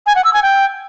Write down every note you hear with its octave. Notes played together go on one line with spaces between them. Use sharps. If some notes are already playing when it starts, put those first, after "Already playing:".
G#5
F#5
E6
G#5
G5